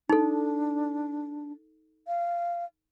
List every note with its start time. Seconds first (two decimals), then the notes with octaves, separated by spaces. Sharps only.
0.09 D4 D#4 A4
2.08 F5